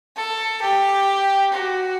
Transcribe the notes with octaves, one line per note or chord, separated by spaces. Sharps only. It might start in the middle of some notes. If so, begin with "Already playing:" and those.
A4
G4
F#4